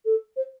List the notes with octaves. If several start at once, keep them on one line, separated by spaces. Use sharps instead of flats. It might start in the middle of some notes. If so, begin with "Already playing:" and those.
A4
C5